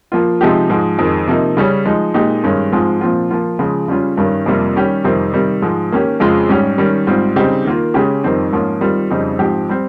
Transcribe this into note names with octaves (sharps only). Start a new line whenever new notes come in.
F3 A#3 F4
C3 F3 G#3 D#4 G4
G#2 F3 G#3
F2 D#3 G#3
C3 F3 A#3 D#4
C#3 G3 C#4
F3 G#3 D#4
A#2 G#3 D#4 G4
G2 D#3 G#3 C#4
G#2 F3 G#3 C4 F4
A#2 F3 C4 F4
F3 A#3 F4
C#3 F3 G#3
C#3 G3 C#4 F4
G2 D#3 G3 C#4
F2 C3 G3 A#3 F4
D#3 G3 C#4 G4
F2 C3 D#3 G3 C4
C3 D#3 G3
G#2 F3 G#3
D#3 A#3 C#4 G4
F2 C#3 G#3 C4 F4
G#2 G3 C#4 G4
D#3 G3 C#4
G#2 G3 C4 F4
C#3 G3 C4 D#4 G4
D#3 A#3 F4
C#3 G#3 C#4 G4
F2 D#3 G3 C4 D#4
G#2 F3 A#3 C#4 F4
D#3 G3 C4 F4
F2 C#3 G3 C4 D#4
G#2 F3 C4 G4
G3 C4